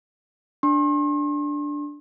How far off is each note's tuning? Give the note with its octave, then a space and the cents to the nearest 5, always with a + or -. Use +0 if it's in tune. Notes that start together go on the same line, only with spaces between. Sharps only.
D4 +0 C6 +45